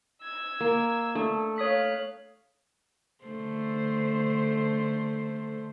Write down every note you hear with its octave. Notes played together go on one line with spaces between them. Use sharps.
E6 G#6
A#3
A3 D4
C#5 F5 D#6 F#6 B6
D3 A3 C5